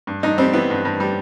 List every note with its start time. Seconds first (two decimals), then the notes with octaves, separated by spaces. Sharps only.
0.07 G2
0.23 G2 D#4
0.38 G3 C4
0.53 E3 B3
0.70 G2
0.85 G2
1.00 G3